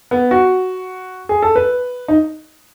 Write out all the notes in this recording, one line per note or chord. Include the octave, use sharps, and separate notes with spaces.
B3
F#4
G#4
A4
B4
D#4